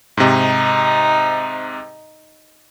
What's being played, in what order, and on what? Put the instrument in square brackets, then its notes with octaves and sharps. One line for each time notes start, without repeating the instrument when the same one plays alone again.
[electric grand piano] G#2 C3 [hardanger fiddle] D#4